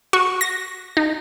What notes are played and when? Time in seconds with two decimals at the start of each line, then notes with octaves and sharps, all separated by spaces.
0.13 F#4
0.41 A#6
0.97 D#4